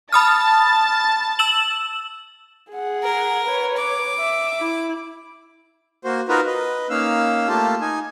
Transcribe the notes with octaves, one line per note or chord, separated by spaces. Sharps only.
A5 B5 D#6 F6 A6
E6 E7 F#7
G#4 F#5
A#4
B4 C#5
D6
E5
E4
A#3 F#4 C5
D#4 F4 F#4 A#4 B4
B4 D#5
A#3 C#4 D#4 F5 E6
A3 A#3 F4 G4 A5
D#4 G#5